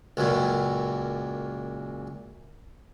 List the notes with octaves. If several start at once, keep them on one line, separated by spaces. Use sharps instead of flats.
C#2 F#2 A#2